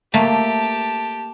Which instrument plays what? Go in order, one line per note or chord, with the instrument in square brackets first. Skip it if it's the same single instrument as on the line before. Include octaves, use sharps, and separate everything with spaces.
[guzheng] A3 A#3 [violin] G4 A5